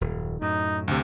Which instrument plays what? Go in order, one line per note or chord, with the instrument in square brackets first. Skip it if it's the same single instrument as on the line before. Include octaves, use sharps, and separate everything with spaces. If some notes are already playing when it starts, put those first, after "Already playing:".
[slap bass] D#1 F#2
[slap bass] F#2 A2 [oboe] D#4
[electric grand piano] D2 C3